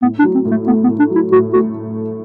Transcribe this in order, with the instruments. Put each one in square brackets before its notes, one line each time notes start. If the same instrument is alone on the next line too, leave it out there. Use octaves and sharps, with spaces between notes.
[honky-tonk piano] A2 [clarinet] B3
[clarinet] D4
[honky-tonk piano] F#3
[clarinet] C4
[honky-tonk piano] A2
[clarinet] A3
[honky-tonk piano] A3 [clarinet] B3
[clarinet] B3
[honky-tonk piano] A2
[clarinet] D4
[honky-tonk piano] F#3
[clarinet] E4
[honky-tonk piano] A2 [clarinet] F#4
[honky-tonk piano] A3 [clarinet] F#4